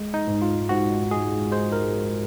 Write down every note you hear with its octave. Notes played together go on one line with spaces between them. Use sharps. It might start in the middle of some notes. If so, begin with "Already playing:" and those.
Already playing: G#3
D#4
G#2
F4
G#2 F#4
G#3 G#4
G#3 C5
A#4